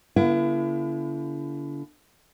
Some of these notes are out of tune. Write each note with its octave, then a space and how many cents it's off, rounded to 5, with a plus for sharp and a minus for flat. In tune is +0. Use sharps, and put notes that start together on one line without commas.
D3 -40 B3 -45 E4 +35